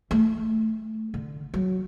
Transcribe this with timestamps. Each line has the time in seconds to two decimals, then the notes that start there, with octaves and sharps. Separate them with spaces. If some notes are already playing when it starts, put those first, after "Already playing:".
0.11 A3
1.14 D3
1.54 F#3